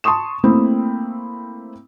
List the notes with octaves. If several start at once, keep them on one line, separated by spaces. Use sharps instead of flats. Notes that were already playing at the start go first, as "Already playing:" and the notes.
A5 C6 C#6 D#6 E7
A3 A#3 C4 E4